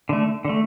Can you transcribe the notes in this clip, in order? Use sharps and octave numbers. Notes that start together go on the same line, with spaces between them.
D3 A3
D3 A3